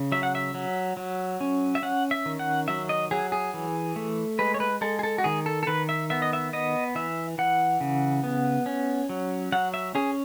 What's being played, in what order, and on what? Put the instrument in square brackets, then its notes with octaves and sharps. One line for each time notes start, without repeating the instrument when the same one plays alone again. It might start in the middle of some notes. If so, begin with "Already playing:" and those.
Already playing: [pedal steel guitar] C#3
F#3 E5
F#5
E5
F#3
F#3
C#4
E5
C#4 F#5
E5
D#3
F#5
F#3 E5
D#5
F#3 G#4
G#4
E3
A3
G#3 B4
C#5
B4
G#3 A4
G#4
A4
F#4
D#3 G#4
A4
A4
D#3 B4
E5
B3 E5
D#5
E5
B3 D#5
E3 E5
E3 F#5
C#3
B3
C#4
F#3
F#3 F#5
E5
C#4 G#4